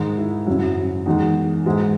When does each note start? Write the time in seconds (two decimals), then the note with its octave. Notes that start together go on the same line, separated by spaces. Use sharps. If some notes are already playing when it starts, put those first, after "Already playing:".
Already playing: G#2 D#3 G#3
0.18 E4
0.47 F#2 C#3 F#3 E4
1.06 E2 D#3 G#3 D#4
1.66 G#2 E3 G#3 E4